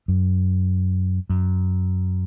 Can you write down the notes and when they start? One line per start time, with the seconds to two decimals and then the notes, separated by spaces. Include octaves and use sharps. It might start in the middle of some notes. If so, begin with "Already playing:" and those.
0.08 F#2
1.30 F#2